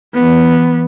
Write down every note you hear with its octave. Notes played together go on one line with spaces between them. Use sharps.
E3 B3